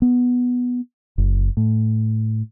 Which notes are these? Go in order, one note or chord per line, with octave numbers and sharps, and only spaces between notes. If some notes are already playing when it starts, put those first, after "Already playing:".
B3
F#1
A2